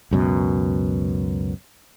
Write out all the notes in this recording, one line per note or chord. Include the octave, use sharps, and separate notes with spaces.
C#2 F#2 B2